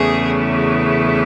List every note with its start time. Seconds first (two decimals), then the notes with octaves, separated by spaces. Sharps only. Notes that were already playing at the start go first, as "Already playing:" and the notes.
Already playing: E2 C#3 E3 A3 C#4 G#4